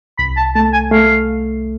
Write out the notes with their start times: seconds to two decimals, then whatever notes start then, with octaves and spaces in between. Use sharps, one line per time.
0.18 C2 B5
0.36 A5
0.55 A3 A5
0.73 G#5
0.91 A3 F5